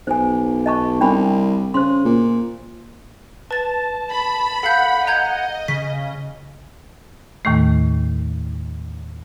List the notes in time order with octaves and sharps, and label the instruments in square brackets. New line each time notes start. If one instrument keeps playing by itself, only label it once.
[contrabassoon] B1 [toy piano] C5 G#5
[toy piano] D#5 A5 C#6
[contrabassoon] C2 [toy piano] D4 G5 B5
[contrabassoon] C#3 [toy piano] C5 C6
[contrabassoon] A#2
[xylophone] B4 A6 [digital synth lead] A5
[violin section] B5
[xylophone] A4 F5 G6 [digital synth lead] F#5
[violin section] D#5 [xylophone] A#5 G6 G#6
[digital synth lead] C#3 [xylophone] B6
[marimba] D#2 A2 D#3 A3